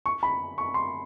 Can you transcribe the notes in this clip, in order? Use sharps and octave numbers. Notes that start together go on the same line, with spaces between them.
C#6
B5
C#6
C6